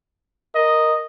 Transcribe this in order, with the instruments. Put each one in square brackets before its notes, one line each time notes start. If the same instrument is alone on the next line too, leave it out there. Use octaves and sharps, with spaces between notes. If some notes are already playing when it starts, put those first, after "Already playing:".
[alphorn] A#4 [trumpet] D#5